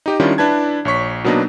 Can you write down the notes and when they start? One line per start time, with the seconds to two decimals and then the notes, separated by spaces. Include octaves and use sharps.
0.06 D#4 G4 D#5
0.20 D#3 G3 C#4 D4 E4 F4
0.38 D4 E4 B4 A5 G#6
0.85 A#1 C#5 C#6 B6
1.24 B2 F#3 A#3 B3 D4 D#4